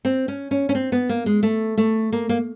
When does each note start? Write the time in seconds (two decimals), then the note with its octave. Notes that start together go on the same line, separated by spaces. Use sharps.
0.05 C4
0.28 C#4
0.51 C#4
0.69 C#4
0.75 C4
0.92 B3
1.09 A#3
1.26 G#3
1.43 A3
1.77 A3
2.12 A#3
2.29 A#3